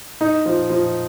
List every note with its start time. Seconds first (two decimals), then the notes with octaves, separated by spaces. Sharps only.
0.21 D#4
0.46 F3
0.70 F3